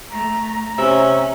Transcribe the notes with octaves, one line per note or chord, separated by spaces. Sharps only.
A3 A#5
C3 C#4 E5